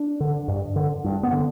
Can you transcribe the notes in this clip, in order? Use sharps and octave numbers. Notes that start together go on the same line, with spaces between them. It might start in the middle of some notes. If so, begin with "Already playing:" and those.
Already playing: D4
D3
G2
D3
G2
B3
D3